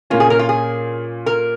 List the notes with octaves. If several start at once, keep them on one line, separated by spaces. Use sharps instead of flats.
A#2 A#3 C#4 F4
G#4
A#4
F4
G#4
A#4